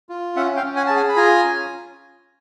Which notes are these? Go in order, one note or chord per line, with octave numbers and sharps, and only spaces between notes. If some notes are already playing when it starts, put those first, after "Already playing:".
F4
C#4 E5 F#5
F5 G5
C#4
F#5 G#5
G#4 A5
F#5 G#5
B5
F4 G#5 A#5
C#4